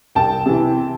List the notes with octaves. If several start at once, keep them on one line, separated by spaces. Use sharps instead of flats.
C2 G5 A5
C3 E3